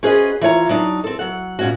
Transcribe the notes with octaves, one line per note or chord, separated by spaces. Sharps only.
C#4 F#4 G#4 B4 C5 D#5
E3 F4 C#5 A#5
F#3 D4 D#4
C4 A4
F#3 F#5
A#2 C#4 F#4